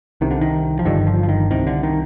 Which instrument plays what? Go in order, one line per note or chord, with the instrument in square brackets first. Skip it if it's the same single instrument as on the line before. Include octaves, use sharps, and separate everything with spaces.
[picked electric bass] C2 C3 D#3
D3
D#3
F3
G1 G2 D3 D#3
F3
F3
D#3
C2 C3 D#3
D3
D#3